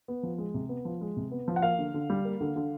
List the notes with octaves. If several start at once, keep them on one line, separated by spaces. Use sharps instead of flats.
B3
F3
G#3
C3
B3
F3
G#3
C3
B3
F3
F#5
A#3 F5
D3
D3
G3
A#3
D3
D3